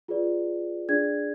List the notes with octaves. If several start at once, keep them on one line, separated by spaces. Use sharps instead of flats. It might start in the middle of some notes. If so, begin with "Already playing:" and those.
F4 G#4 B4 D5
D4 G#4 D5 G#6